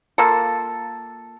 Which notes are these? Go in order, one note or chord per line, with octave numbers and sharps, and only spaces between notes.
A#3 F4 A4